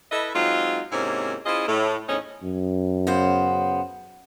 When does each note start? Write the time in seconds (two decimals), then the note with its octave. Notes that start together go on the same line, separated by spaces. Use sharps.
0.11 E4 A4 B4 D#5 E5
0.35 F#3 G#3 C4 D#4 F4
0.92 G#2 C3 A#3 C#4 D#4 E4
1.46 C#4 E4 F4 G#4 C5 D#5
1.68 A2
2.09 E2 A2 C4 C#4 D#4
2.43 F#2
3.07 C#3 B3 C5